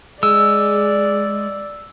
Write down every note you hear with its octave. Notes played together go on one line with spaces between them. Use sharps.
G#3 G#4 D5 E6